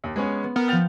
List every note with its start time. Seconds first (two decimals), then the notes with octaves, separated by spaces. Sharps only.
0.04 D#2
0.16 G#3 B3 C#4
0.44 B3
0.56 B3 A#4 F6
0.68 F3 G5 F6 A6 F7